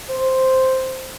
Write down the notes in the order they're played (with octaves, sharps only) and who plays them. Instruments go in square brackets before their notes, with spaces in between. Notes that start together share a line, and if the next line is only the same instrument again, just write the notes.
[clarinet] C5